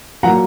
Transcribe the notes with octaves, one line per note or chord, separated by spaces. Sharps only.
A#2 F#3 A#3 F#5 A#5